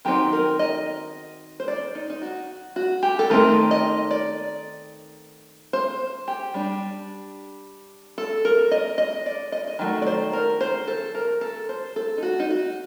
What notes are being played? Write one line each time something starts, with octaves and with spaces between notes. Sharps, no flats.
D#3 F#3 C4 D#4 G4
A#4
D#5
C5
D5
D#4
D#4
F#4
F#4
G4
A4
D#3 A3 C4 D#4 A#4
D#5
D5
C5
G4
G3 D4
A4
A#4
D#5
D#5
D5
D#5
D#5
D#3 F#3 A3
D5
C5
A#4
C5
A4
A#4
A4
C5
A4
D#4
F#4
D#4
F#4